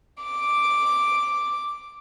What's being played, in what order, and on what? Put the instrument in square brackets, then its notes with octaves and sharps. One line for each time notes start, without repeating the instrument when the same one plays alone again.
[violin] D6 D7